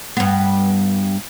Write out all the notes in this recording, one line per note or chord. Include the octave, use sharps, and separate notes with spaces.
G2 B3